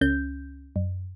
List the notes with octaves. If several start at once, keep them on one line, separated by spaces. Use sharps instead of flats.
C#2 C#4 G6
F#2